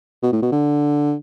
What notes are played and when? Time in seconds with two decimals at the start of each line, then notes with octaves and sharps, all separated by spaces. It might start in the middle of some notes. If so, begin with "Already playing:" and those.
0.23 B2
0.33 A2
0.42 B2
0.52 D3